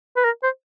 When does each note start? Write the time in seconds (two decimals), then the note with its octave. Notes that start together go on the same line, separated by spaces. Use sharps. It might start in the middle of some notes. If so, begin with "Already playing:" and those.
0.17 B4
0.25 A#4
0.43 C5